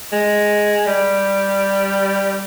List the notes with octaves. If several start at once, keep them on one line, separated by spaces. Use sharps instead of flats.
G#3
G3